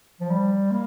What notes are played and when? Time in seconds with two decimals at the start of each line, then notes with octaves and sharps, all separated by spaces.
0.21 F3
0.29 G3
0.71 A#3